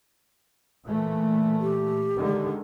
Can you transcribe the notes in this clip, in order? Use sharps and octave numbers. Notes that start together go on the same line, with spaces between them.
A#2 E3 A3
G4
D3 D#3 G#3